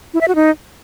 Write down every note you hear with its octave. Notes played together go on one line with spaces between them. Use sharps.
E4
E5
F#4
D#4